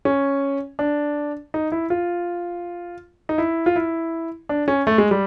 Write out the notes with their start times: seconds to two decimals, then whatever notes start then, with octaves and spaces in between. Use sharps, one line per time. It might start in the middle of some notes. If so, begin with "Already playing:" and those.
0.05 C#4
0.79 D4
1.54 D#4
1.72 E4
1.90 F4
3.29 D#4
3.38 E4
3.66 F4
3.76 E4
4.49 D4
4.68 C#4
4.87 A3
4.98 G#3
5.11 G3